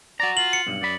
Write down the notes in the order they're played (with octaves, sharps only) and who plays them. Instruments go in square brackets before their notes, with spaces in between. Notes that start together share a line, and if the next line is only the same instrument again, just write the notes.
[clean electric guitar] F#4 A#5 [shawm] D5
[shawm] F4 [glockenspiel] F#7
[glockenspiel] C#7
[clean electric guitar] B1 G2
[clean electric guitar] F#2 B5 [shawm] D5